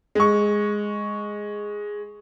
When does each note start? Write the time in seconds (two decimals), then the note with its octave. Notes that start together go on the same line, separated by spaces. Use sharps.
0.15 G#3 C#6